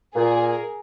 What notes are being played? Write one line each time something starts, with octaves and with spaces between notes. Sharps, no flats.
A#2 G#4 A#4